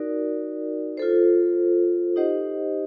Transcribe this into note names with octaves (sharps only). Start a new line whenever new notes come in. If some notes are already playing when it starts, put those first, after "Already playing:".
Already playing: D#4 F#4 A#4 D5
F4 A4 C5
D#4 G4 C5 D#5 F#5